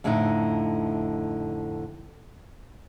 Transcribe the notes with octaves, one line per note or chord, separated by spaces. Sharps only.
F2 A2 D3 A3 D#4